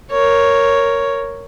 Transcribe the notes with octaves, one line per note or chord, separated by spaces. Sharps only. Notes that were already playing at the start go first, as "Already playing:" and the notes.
A#4 C#5